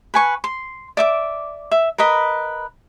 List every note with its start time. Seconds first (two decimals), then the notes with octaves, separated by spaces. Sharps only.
0.14 B4 G#5 C#6
0.44 C6
0.97 D5 E5 D6
1.71 E5
1.98 A#4 B4 D#5 B5